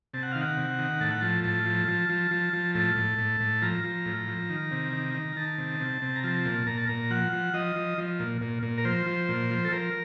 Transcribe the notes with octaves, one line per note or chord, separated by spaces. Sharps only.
C3 A5
F#5
D#3 F5
F#5
C3
D#3
A2 A5
F#5
F3 A5
A2 A5
F3
F3
F3
F3
F3
A2 A5
A2
A2
A2
F3 A#5
F3
A2
F3
D#3
C3
D#3
D#3
D#3 A5
C3
C3
C3
A#5
F3 A5
A#2
A#2 A#5
A5
A#2 A#5
F3 F#5
F3
F3 D#5
F3
F3
A#2
A#2
A#2
A#4
F3 C5
F3
A#2
F3
A4
F3 A#4